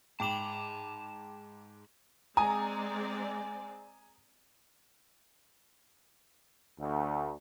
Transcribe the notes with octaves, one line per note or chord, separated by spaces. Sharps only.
G#2 G5 A5 B5 D6 E7 F7
G#3 C4 D5 G#5 A#5 D#6
D2